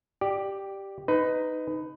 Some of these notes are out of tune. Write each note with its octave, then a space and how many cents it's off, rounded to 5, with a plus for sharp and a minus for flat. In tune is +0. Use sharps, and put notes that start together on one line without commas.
G4 +0 D5 +15
D#4 +0 B4 +20